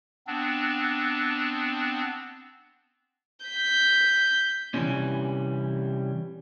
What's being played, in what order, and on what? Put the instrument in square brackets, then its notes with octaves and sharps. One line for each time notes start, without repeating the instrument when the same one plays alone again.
[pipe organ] B3 C4 D4
[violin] G6 B6
[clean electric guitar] C3 E3 F3 G3 C4 C#4